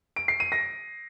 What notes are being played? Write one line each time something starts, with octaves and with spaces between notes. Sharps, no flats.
D7
C7
D#7
A#6